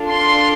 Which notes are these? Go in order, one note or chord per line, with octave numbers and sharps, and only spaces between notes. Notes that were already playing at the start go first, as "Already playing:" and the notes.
Already playing: D4 F4 A4
C6